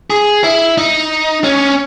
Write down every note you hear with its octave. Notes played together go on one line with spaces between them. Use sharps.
G#4
E4
D#4
C#4